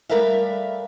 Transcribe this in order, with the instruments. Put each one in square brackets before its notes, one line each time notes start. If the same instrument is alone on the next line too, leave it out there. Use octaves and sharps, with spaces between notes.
[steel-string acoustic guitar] G3 A3 A#4 B4 E5 F5